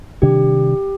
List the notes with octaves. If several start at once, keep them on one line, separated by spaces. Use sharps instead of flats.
C3 D#3 G3 D4 G4